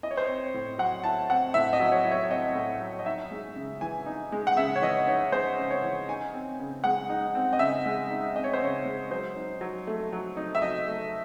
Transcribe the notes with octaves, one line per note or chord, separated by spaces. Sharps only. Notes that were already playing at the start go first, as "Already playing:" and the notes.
E4 D#5
C#5
C5
C4 C#5
A2
F#3 F#5
E4 A5
C4 F#5
A2 E5
D#5
F#3
C#5
E4
C#5
C4 D#5
A2
F#3
D#5
D#4 E5
G#3
C#3
E3 G#5
D#4
G#3
F#5
C#3 E5
C#5
E3 D#5
D#4 C#5
G#3 C5
C#3
C#5
E3
D#4 G#5
C4
C#3
G#3 F#5
D#4
C4
D#5
C#3 E5
G#3
D#4
C4 D#5
C#5
C5
C#3 C#5
G#3
F#3 C5
D#4
F#3
A3
F#3
D#4
E5
F#3 D#5
A3